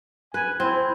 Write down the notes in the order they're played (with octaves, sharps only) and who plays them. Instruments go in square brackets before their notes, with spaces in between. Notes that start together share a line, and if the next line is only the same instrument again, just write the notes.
[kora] B4 [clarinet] G#5
[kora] C4 [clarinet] E4